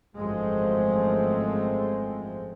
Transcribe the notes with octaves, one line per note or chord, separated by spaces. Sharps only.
G#1 F#2 F3 G#3 A3 C4